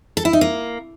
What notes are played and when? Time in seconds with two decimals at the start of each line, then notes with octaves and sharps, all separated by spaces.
0.17 A4
0.25 E4
0.33 D#4
0.41 A#3